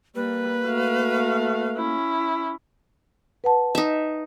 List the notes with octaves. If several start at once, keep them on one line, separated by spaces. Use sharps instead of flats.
G3 A#3 B4
A3 F#4 F5
C#4 E4
B4 F#5 A5
D#4 E5